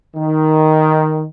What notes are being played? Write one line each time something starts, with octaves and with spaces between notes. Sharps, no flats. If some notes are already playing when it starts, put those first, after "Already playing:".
D#3